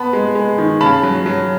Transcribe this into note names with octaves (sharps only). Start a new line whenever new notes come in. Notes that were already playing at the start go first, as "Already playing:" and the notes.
Already playing: B3 A5 B5
G#3
G#3
D#3
C#3 A5 B5
F#3
F#3